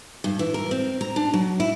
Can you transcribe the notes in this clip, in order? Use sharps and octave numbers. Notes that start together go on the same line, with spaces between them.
G2
E3
A#4
C4
A#5
D4
F#3
E4